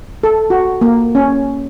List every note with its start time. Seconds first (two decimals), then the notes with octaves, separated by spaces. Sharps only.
0.23 A4
0.50 F#4
0.81 A#3
1.15 C#4